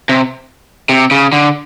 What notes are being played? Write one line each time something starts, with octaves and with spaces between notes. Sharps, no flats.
C3
C3
C#3
D3